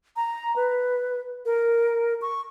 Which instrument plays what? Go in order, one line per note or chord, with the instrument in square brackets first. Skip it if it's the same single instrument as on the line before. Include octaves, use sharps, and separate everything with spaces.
[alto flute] A#5
B4
A#4
C#6